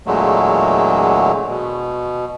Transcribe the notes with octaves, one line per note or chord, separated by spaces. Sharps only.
E2 A#2 D3 F#3 G#3 A3
B2